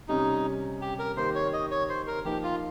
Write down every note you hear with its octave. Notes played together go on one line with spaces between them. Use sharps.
C3 G3 C#4 D#4
G4
A#4
D#3 A#3 D#4 G4 C5
C#5
D#5
C#5
C5
A#4
F3 A#3 D#4 G4
F4